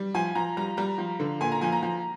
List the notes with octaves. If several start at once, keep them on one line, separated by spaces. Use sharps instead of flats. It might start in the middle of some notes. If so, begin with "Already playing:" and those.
Already playing: G3
F3 G#5
F3 A#5
G3 A#5
G3 A#5
F3
D3
A#2 G#5
A#5
F3 G#5
A#5
F3